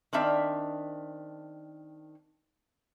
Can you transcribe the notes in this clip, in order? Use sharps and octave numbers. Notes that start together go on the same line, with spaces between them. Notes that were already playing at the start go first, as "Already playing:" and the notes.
D#3 C4 D4 E5 F5